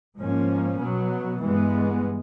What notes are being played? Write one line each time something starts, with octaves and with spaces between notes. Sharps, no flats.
G#2 F3 A#3 C#4
B2 F#3 B3
G2 E3 G#3 B3